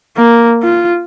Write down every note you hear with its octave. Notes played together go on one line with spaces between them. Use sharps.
A#3
F4